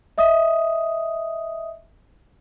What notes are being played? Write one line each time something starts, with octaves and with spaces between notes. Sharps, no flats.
D#5 E5 D#6